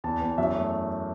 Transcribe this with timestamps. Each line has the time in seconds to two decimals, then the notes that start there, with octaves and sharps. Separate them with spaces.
0.04 E2 A5
0.21 E2
0.38 F#2 E5
0.55 A3